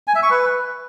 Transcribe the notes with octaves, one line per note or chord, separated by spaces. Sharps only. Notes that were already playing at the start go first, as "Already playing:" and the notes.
G#5
E5
C#6
B4